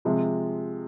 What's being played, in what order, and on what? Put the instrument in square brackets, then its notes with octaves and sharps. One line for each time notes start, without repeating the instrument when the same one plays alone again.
[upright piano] C3 F3 G#3